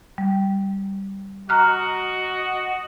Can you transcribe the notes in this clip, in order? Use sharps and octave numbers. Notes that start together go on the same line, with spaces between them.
G3
F#4 D#5 A#5 F6 F#6